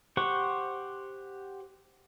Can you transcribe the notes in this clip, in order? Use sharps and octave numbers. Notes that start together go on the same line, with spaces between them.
G4 C5 F#5 C#6